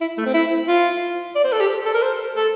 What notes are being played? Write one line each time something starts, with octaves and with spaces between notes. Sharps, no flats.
E4
A3
C4
E4
F4
D5
C5
A4
G4
A4
A#4
C5
A4